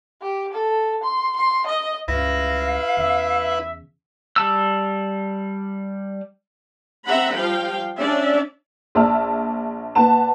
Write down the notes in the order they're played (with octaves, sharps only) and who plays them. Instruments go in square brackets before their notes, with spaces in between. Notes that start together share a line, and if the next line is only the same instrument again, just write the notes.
[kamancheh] G4
A4
C6
C6
D#5
[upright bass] C#2 G2 [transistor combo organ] E4 B4 [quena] F5 [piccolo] A#6
[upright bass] E2 C#3 [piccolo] E5
[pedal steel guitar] G3 A5 E6
[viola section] C4 E5 F#5 A#5 B5
F3 G3 F5 G5
C#4 D4 D5 E5
[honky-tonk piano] A#1 D5 E5 A5 E6 F6
A#2 B4 F#5 A5 E7